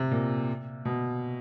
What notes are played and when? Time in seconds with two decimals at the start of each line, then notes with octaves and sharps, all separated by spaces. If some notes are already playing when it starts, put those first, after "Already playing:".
Already playing: C3
0.11 A#2
0.85 B2